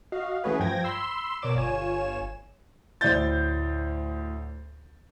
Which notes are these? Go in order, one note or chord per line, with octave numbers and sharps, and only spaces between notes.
F#4 D#5 F5
E3 A3 C#4 F#4 G#4 B4
G2 F3 G5 G#6 A#6
B5 C6 E6
B2 A#4 C#5 D5 D6 E7
G1 F4 C#5 G#5 E7
D2 A2 C5 D5 G6 A6